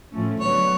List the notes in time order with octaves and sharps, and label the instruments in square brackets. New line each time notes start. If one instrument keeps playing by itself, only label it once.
[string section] A2 F3 A3 C#4
[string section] D3 F#3 B3 [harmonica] C#5